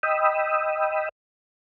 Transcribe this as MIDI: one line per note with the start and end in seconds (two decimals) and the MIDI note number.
0.03 1.09 75
0.03 1.09 79
0.03 1.09 83
0.03 1.09 87
0.03 1.09 88